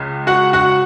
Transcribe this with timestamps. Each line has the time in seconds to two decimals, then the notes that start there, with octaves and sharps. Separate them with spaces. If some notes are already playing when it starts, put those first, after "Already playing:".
Already playing: C#2 C#3
0.27 F#4 F#5
0.53 F#4 F#5